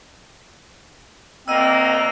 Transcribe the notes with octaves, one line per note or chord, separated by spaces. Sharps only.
D2 A#3 C4 D#5 E6 D#7